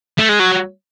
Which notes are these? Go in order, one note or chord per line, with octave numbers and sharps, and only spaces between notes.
A3
G#3
F#3